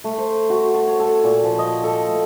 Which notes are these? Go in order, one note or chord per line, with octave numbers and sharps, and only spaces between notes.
A3
C5
F#4
A5
C#5
A4
A#2
F3
D#5
A4
A3